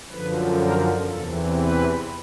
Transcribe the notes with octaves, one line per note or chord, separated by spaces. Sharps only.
F#2 D3 F3 B4
A#4
E2 C3 E3 A4
B4